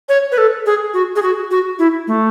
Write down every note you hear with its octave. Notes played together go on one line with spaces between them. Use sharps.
C#5
B4
A4
G#4
F#4
G#4
F#4
F#4
E4
A3